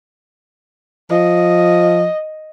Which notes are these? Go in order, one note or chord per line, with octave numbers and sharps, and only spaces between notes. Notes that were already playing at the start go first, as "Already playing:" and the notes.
F3 D#5